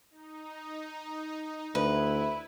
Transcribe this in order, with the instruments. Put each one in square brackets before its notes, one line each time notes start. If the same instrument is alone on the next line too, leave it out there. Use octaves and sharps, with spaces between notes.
[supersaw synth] D#4
[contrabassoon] D2 [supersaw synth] E4 [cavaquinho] B4